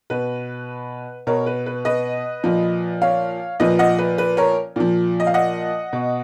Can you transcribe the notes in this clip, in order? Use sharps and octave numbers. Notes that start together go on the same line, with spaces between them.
B2 B4
B2 A#4 C#5
B4
B4
B4 D#5
A#2 F3
C#5 F5
A#2 F3 B4 D#5
D#5 F#5
B4
B4
A#4 C#5
A#2 F3
D#5
F5
D#5 F#5
B2